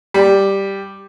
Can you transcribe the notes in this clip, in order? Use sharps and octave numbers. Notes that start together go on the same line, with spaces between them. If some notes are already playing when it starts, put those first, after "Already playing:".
G3